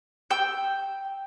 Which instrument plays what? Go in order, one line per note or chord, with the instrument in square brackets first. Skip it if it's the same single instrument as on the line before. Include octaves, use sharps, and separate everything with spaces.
[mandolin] G5 E6